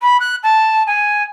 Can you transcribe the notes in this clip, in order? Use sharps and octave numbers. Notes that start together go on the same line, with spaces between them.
B5
F#6
A5
G#5